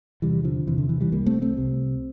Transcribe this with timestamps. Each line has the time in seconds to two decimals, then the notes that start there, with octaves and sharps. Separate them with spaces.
0.22 E2 C3 E3 G3
0.44 D3 F3
0.67 E2 C3 E3
0.78 D3
0.89 E3
1.01 E3 G3
1.12 C2 C3 G3 A#3
1.26 A3 C4
1.42 A3 C4
1.57 C2 C3